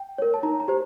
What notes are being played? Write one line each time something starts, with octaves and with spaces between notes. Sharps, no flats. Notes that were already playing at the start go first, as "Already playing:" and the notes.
Already playing: G5
A#4 C#5
A5
D#4 A#5
A#5
G4 C5